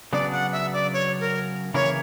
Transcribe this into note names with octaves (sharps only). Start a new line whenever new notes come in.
C#3 F#3 B3 D4 D5
F#5
E5
D5
C#5
A#4
C#3 E3 A#3 E4 A#4 C#5